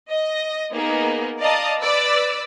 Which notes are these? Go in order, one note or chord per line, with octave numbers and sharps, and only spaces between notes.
D#5
A#3 B3 D#4 G#4
D5 D#5 F5 A5 A#5 D#6
B4 D5 E6